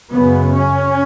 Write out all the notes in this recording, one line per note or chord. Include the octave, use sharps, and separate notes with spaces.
F#2 C#3 B3
C#4